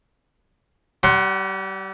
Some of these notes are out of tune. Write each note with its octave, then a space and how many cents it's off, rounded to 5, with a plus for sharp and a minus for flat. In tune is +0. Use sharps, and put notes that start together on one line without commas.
G3 -30 F#5 +20 C6 +20